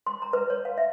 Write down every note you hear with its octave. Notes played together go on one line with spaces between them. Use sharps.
C6
A#5
B4
C#5
F5
E5